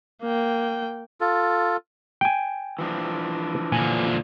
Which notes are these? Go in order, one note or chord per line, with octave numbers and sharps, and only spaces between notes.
A#3 G5
F4 A4
G5 G#5
E3 F3 D4
A#2 D3 G#5